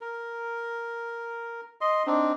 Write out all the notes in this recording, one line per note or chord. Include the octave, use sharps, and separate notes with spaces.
A#4
D#5 C6
C4 D4 D#4